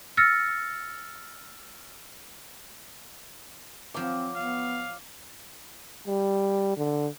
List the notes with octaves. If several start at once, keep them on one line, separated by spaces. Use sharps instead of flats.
E6 F6 A6 A#6 C#7
F3 F#3 C4 D6
B3 F5
G3
D3